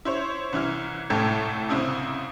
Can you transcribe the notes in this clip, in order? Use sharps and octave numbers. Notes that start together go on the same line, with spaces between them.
E4 C5 C#5
C2 E3 E4 F6
C2 A2 A3 A4 G5 G#6
C2 C#3 C4 E4 D#6